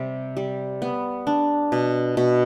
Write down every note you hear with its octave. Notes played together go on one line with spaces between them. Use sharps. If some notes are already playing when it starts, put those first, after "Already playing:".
Already playing: C3 G3
G3
B3
D4
B2
B2